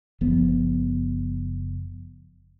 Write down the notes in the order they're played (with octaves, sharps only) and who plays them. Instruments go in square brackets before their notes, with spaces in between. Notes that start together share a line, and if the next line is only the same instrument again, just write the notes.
[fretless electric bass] F#1 F3 B3